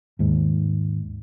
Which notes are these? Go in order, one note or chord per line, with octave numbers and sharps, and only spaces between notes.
D#2 G#2